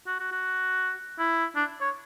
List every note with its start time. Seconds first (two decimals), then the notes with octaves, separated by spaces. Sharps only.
0.07 F#4
0.20 F#4
0.32 F#4
1.19 E4
1.55 D4
1.81 C#5